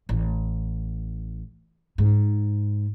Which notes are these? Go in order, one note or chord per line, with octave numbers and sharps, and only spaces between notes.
A1
G#2